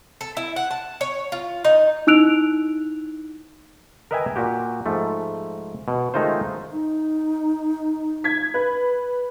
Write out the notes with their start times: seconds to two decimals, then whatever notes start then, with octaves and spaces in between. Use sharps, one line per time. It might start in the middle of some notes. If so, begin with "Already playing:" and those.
0.21 A4
0.37 E4
0.56 F#5
0.71 A5
1.01 C#5
1.32 F4
1.65 D#4
2.07 D#4 E4 E6 F#6 D7 F7
4.11 A#4 B4 D#5 E5 G5 G#5
4.36 A#2 F#4 G4
4.86 G#2 F3 A3
5.88 B2
6.14 D#3 G#3 A3 D#4 F4 C5
6.72 D#4
8.24 G#6 B6
8.54 B4